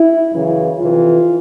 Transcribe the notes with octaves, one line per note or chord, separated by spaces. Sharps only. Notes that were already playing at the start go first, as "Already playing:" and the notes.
Already playing: E4
F#2 C#3 E3
F2 C3 E3 F4